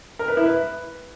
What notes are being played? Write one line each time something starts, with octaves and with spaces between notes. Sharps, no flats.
A#4
B4
E4
B4